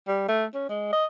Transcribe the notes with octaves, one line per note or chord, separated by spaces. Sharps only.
G3
A3
C#4
G#3
D#5